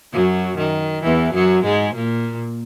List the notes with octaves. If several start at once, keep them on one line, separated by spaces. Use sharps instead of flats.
F#2 F#3
D#3
E2 E3
F#2 F#3
G#2 G#3
A#2 A#3